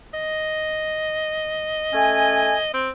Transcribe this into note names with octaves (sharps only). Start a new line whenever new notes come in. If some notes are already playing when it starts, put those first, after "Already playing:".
D#5
A3 C#4 G#5
C4